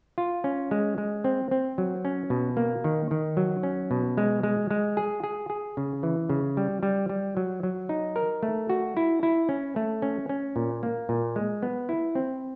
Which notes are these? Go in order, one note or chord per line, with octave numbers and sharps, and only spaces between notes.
F4
C#4
G#3
G#3
C4
C4
F#3
C#4
B2
A#3
D#3
D#3
F#3
C#4
B2
G#3
G#3
G#3
G#4
G#4
G#4
C#3
E3
C#3
G3
G3
G3
F#3
F#3
D#4
A#4
A3
F#4
E4
E4
C#4
A3
C#4
C#4
A#2
A#3
A#2
G#3
B3
E4
C4